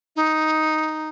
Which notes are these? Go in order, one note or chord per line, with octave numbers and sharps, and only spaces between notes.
D#4